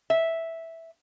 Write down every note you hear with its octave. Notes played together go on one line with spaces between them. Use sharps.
E5